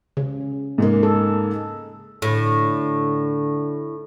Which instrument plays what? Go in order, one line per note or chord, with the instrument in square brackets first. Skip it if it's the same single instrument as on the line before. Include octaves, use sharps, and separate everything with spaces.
[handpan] C#3
[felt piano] G#2 G#3 A#3
[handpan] A4
[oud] A2 [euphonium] D3